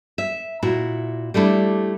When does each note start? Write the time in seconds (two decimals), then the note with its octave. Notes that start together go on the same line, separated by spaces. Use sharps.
0.18 E5
0.63 A#2 E4 F#4
1.34 G3 A3 D4 E4